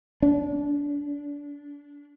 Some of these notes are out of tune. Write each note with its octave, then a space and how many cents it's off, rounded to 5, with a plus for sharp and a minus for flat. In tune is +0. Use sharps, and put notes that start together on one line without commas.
D4 -25